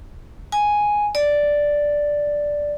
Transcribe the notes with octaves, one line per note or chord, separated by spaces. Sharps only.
G#5
D5